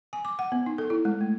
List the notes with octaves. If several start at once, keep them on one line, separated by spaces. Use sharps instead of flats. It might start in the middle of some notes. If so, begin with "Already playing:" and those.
G#5
D6
F#5
B3
D#4
A4
E4
G#3
A3